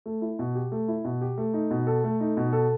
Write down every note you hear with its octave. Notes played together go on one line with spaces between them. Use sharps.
A3
E4
B2
G4
A3
E4
B2
G4
A3
D#4
B2
A4
A3
D#4
B2
A4